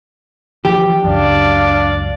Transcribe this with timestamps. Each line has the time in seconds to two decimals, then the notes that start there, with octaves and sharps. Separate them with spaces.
0.65 E3 F3 G4
1.04 C#2 F#2 D4 D5 F5